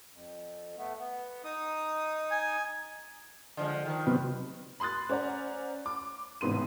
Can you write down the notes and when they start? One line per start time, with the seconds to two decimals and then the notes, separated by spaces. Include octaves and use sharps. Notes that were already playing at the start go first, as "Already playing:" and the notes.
0.13 F2
0.78 A3 B3
0.99 B3
1.44 D#4 D#6
2.31 G#5
3.57 D3 F3 G#3
3.85 D#3 F3
4.07 C3 F#3 B3
4.80 B5 C6 D#6 F#6 A6
5.09 C#4 C5 D5 F#5 A#5
5.86 D6
6.41 A1 G#2 C3 B3 C6 D#7